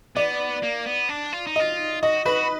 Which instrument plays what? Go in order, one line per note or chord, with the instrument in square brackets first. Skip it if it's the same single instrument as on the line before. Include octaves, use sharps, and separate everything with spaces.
[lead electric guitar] B3 [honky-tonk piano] D5
[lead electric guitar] A#3
B3
D4
F4
D#4
[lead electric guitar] F4 [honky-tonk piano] D#5
[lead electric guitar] F#4 [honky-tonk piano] D#5
[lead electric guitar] F#4 [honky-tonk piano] B4